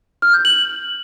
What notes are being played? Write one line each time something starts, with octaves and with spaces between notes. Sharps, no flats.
F6
G6
F#7